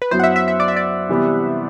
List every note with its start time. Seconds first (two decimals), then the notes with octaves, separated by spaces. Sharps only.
0.02 B4
0.11 F#2 F#3 B3 E4 C5
0.20 F#5
0.24 E5
0.36 E5
0.48 E5
0.60 D5
0.68 E5
0.76 D5
1.09 C3 E3 G3 B3